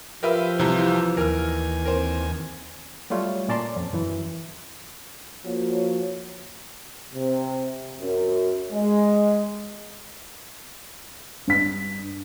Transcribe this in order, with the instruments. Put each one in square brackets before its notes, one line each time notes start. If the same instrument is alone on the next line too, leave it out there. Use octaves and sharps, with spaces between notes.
[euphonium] F3 [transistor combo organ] F4 G4 [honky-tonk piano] A#4 B4 E5
[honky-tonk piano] C2 C3 [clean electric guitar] E3
[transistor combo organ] D#2 G#5 [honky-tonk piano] A#4 F6
[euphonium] C4 [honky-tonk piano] A#4 C5
[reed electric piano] F#3 G3 A3 F4 C#5
A#2 C#4 D5 A5 A#5 C6
F2
F#2 E3
[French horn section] F3 A#3 F#4 C#5
[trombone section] C3
F#2
G#3
[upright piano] G2 B6